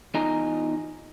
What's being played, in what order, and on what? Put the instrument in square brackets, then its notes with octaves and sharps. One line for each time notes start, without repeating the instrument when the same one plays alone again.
[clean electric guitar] E2 D#4 F4 D#5 G#5 A#5